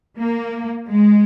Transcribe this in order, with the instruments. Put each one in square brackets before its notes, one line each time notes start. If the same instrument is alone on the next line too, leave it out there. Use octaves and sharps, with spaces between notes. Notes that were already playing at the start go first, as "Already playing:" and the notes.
[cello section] A#3
G#3